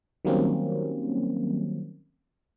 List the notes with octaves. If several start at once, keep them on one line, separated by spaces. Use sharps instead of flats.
D#3 F#3 G3 A#3 C4 C#4